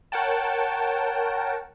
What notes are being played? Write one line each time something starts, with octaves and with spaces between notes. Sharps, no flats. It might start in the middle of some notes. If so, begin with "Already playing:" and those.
A#4 C#5 F#5 G5 A5